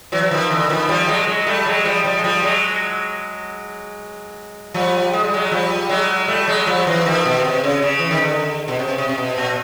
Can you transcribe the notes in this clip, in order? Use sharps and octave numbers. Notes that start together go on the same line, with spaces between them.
E3 F#3
F#3
D#3 F3
D3 E3
D#3 F3
F3 G3
F#3 G#3
F#3 G#3
G3 A3
F#3 G#3
F3 G3
F3 G3
G#3
F3 G3
F#3 G#3
F3 G3
G#3
G3
F#3 G#3
F3 G3
F#3 G#3
G3 A3
F#3 G#3
F3 G3
E3 F#3
D#3 F3
B2
C3
C#3
C#3
E3
D#3
D3
B2
C3
C3
C3
B2
A#2